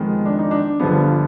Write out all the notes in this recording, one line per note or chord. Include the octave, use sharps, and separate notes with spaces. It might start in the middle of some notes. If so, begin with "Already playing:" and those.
Already playing: F2 D#3 G#3 B3
D4
D#4
D4
G1 G2 D3 F3 B3